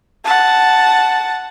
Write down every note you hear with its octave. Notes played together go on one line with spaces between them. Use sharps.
F#5 A5